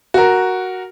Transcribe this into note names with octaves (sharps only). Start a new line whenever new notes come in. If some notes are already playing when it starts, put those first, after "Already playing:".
F#4 A#4